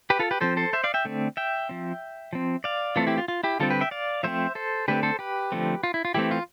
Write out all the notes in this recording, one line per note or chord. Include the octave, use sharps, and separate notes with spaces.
G4 B4
F4 A4
G4 B4
F3 C4 A4 C5
A4 C5
C5 E5
D5 F5
E5 G5
D3 A3 C4
E5 G5
F3 C4
F3 C4
D5 F5
E3 A3 C4 F4 A4
E4 G4
F4
F4
E4 G4
D3 G3 C4 F4 A4
G4 B4
E5 G5
D5 F5
F3 A3 C4 C5 E5
A4 C5
D3 A3 C4 G4 B4
A4 C5
G4 B4
D3 F3 A3 C4
F4
E4
F4
E3 A3 C4 E4 G4
F4